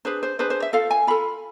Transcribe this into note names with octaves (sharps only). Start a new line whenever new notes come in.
D4 G#4 B4 C5
C5
D4 G#4 B4 C5
C5
E5
F4 A4 F5
G#5
F4 A4 B5